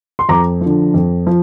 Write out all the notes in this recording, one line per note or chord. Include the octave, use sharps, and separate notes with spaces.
C6
F2 A#5 D6
D3 F3
F2
F3